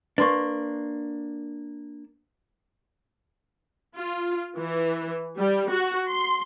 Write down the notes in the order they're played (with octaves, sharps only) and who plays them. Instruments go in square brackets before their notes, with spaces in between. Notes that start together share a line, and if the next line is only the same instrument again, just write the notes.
[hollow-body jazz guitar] A#3 D4 [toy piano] B4 C6 C#6
[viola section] F4
E3
G3
F#4
C6